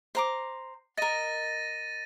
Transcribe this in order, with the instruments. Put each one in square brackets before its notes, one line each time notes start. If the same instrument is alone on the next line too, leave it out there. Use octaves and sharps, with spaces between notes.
[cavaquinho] C5 A#5 D6
[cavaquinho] A#4 D#5 [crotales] A6 A#6 D#7